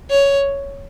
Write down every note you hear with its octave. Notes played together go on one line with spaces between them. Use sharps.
C#5